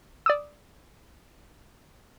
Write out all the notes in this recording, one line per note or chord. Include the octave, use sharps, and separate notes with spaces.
D5 D#6 E6